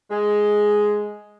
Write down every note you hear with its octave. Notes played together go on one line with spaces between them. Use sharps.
G#3